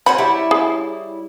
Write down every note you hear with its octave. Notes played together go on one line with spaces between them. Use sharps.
C#4 F#4 C5 B5
G3 E4 C#5
G#4